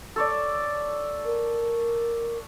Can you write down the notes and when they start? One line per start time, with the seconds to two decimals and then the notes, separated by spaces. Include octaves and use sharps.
0.16 A4 C#5 D5
1.25 A#4